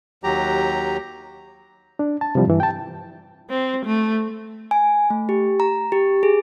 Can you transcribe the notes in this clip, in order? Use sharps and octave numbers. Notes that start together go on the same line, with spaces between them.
D#2 F#3 G4 A#5
D4
A5
C3 E3 F3 G3
G2 E3
G5 A5
C4
A3
G#5
A3
G4
A#5
G4
G#4